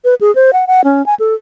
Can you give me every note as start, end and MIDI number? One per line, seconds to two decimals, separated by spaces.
0.04 0.15 71
0.21 0.34 68
0.35 0.51 72
0.53 0.65 78
0.67 0.84 78
0.84 1.04 61
1.06 1.15 80
1.20 1.34 69